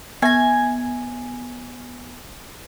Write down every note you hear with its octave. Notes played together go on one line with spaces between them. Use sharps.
B3 G#5 A#6